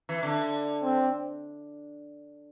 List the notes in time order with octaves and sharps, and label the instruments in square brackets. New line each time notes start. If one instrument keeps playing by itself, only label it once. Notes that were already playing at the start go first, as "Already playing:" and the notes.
[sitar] E3
D3
[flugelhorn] C4